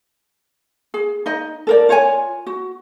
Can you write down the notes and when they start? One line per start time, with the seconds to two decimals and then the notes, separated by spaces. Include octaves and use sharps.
0.94 G#4
1.26 D#4 D#5
1.67 A4 A#4 D5
1.89 F4 C#5 D5 G#5
2.47 F#4